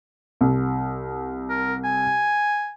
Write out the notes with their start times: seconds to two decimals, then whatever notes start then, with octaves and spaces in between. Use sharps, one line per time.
0.41 C2
1.50 A#4
1.84 G#5